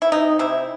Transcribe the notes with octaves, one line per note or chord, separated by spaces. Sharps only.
E4
C3 D#4
C3 E4